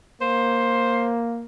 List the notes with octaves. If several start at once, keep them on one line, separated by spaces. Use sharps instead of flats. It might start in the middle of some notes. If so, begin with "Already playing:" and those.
A#3 C5